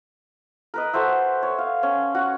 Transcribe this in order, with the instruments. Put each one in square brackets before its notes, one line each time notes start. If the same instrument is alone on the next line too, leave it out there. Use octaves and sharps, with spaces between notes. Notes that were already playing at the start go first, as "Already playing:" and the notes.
[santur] A#4 B4 D#5
F#4 A4 C5 E5
C#5
F5
C#4
F#4 F#5